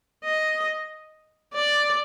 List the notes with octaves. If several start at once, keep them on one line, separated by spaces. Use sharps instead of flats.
D#5
D5